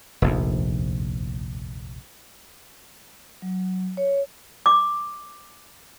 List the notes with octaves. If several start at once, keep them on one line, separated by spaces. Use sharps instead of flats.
F1 A#1 D#2
F#3
C#5
D6